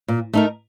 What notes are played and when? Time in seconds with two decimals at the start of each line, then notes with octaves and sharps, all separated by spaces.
0.08 A#2
0.33 A3 D#4 A#4